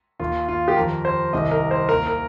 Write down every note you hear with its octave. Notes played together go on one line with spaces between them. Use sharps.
D#2 D#3 F4
F4
G4
F2 D#3 A#4
C5
C2 C3 D#3 D#5
A#4
C5
D#2 D#3 A#4
A#4